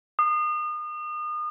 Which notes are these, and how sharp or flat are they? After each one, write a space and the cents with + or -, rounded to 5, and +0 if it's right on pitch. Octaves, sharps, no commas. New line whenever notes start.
D#6 -35